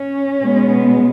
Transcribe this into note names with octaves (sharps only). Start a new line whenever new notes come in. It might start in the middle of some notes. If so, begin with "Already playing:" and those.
Already playing: C#4
B2 G#3 B3